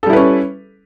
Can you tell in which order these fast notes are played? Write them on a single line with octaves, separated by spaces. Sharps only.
A4 G3 E4 B4 C#4